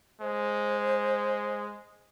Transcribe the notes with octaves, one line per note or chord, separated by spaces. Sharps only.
G#3 C5